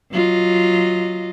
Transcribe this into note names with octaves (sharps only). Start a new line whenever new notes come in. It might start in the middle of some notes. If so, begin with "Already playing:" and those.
F#3 F4 D#5